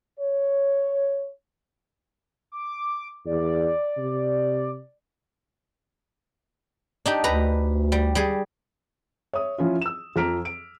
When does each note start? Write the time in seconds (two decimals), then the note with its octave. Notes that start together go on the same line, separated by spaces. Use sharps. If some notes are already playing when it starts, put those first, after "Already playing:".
0.19 C#5
2.52 D6
3.26 E2 D5
3.97 C3
7.06 D4 D#4 G4
7.24 D2 B4 A#5
7.92 G3
8.15 G3 G#4
9.33 C#5 E5 D#6
9.58 F3 C#4 E4 F4
9.81 E6 E7
10.16 F2 F3 A#5 F6 B6 D7
10.45 D7